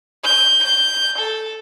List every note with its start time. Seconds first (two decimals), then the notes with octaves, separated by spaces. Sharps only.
0.24 G6
0.63 G6
1.18 A4